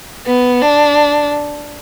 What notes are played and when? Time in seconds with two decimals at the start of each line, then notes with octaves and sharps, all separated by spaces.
0.27 B3
0.62 D4